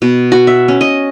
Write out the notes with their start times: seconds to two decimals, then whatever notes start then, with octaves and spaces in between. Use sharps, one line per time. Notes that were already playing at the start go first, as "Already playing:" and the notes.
0.02 B2
0.32 F#4
0.47 E5
0.68 C#4
0.81 D#5